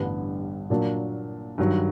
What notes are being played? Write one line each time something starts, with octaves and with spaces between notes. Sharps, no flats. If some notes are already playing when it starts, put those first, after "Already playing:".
Already playing: A1 G2 D3 G3 B3
A#2 F#3 A#3 D4
G2 D#3 F#3